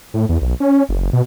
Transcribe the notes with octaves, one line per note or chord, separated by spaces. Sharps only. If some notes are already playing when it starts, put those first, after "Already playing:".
A2
E2
B1
C#4
F#1
B2